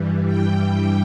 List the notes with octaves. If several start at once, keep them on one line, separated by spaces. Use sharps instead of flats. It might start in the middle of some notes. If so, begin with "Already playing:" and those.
Already playing: G2 E3 G3
G5